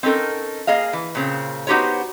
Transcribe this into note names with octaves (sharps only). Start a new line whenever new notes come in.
C4 C#4 D#4 A4 A#4
A#3 G#4 D#5 F5
E3
A#2 C#3 C4
B3 D#4 F#4 G4 C5 C#5